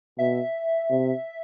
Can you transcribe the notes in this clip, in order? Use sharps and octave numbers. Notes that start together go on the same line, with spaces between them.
B2 E5
C3